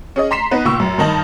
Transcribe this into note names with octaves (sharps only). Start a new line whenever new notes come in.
C#4 G#4 D#5
A#5 C6 B6 C7 E7
B3 D#4 B4
C#2 A#2 C#6 E6
F#2
G2 D#3 D#4 A5 F#7